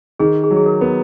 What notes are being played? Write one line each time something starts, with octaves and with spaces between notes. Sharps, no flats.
D#3 G#4
G#4
F#3
G#4
A#4
B3